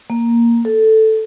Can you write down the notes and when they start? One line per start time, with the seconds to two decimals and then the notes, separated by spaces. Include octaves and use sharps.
0.10 A#3
0.65 A4